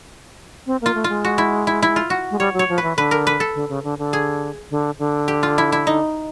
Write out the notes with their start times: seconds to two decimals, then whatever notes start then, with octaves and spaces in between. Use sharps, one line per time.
0.67 C4
0.81 A#3 F4
0.95 A3
1.04 G#3 F4
1.25 F#4
1.38 E4
1.67 E4
1.82 E4
1.96 F4
2.10 F#4
2.31 G#3
2.39 G3 C#5
2.54 F#3
2.59 C#5
2.69 F3
2.78 B4
2.83 E3
2.97 D3 B4
3.11 A#4
3.27 B4
3.40 A4
3.55 D3
3.69 C#3
3.84 D3
3.99 D3
4.13 G#4
4.71 D3
4.99 D3
5.28 G4
5.43 F4
5.58 E4
5.72 E4
5.87 D#4